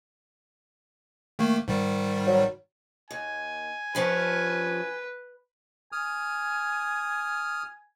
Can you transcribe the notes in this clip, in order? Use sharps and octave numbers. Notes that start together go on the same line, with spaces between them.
D#3 A3 A#3
G#2 D#3 G3
F#3
D#2 G#5
G2 F3 C#4 B4
G#5 D#6 F6